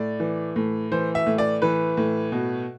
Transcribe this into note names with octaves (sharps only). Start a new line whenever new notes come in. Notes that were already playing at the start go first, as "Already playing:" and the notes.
Already playing: A2 D5
E3
A2
E3 C5
E5
A2
D5
E3 B4
A2
B2